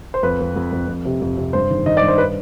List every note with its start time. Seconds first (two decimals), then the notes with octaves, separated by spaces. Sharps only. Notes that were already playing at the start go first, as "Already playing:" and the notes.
0.14 C5
0.23 F2 B4
0.40 F2
0.56 F2
0.72 F2
0.88 F2
1.05 C3
1.22 F2
1.37 C3
1.53 G2 C5
1.70 D#3
1.86 D#3 D#5
1.97 D5
2.02 G2
2.08 C5
2.18 B4